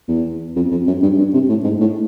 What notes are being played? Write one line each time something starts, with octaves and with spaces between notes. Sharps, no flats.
E2
F2
F2
F#2
G2
G2
C3
A2
G#2
A2